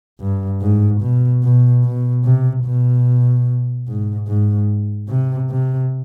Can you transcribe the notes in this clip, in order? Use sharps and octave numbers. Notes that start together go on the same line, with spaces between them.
G2
G#2
B2
B2
B2
C3
B2
G#2
G#2
C3
C3